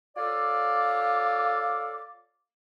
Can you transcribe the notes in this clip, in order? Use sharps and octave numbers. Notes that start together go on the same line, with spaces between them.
F4 A4 C#5 D5 F5 D6